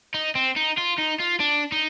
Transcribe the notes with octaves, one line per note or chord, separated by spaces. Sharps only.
D#4
C4
D#4
F4
D#4
F4
D4
D#4